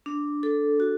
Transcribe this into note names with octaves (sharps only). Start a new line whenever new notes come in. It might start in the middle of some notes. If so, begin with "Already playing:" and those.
D4
A4
F#4